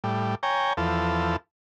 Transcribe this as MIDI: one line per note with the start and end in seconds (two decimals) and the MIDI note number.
0.04 0.35 45
0.04 0.35 55
0.43 0.73 73
0.43 0.73 79
0.43 0.73 80
0.43 0.73 82
0.77 1.36 40
0.77 1.36 53
0.77 1.36 69